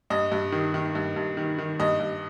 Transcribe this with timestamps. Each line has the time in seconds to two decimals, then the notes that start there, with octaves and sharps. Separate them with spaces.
0.10 G2 D#5
0.32 G2
0.52 D#3
0.74 D#3
0.95 G2
1.16 G2
1.37 D#3
1.59 D#3
1.80 G2 D#5
2.00 G2